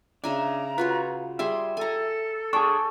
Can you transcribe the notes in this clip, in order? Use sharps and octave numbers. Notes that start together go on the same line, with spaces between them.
C#3 D4 E5 G#5 A#5
F4 F#4 B4 C#5
G3 G#4 E5 G#5 C6
A4 G#5 A#5
D4 G#4 G5 A5 C#6